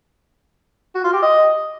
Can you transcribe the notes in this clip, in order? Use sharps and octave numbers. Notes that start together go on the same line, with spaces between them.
F#4
F4
G4
D#5